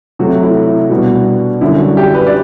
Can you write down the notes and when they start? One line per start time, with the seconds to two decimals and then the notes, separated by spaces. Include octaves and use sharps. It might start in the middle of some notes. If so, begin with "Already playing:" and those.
0.19 C3 F#3 A3 F#4
0.43 E4
0.67 E4
0.90 B2 G3 B3 D4 F#4
1.61 F#2 D3 G3 D4 E4
1.79 F#4
1.97 G4
2.15 B4
2.27 D5